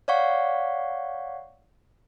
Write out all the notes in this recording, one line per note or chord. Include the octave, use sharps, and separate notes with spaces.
C#5 D5 F5 F#5 C#6